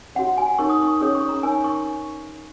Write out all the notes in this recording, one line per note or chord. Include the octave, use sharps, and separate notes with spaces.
F#4 C#5 F#5
G#5
D#4 A#4 C#5 C#6
D#6
C#6
C#4 G#4 C#5 D#6
C#6
A#5
D#4 A#4 C#5 G#5
C#6